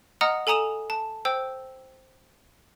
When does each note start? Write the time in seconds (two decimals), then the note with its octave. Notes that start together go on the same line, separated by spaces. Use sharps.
0.21 D#5 F#5 A#5 D#6 F6
0.47 A4 G#5 A#5 D#6 E7 F7
0.90 A5
1.25 C5 G5 E6